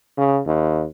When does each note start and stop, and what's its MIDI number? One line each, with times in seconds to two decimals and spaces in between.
0.17 0.40 49
0.46 0.85 39